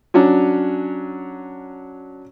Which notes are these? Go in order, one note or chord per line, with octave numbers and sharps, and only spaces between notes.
F#3 C#4 D4